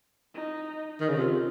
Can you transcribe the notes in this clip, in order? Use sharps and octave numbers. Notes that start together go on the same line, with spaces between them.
D#4
D#3
C#3
C3 F4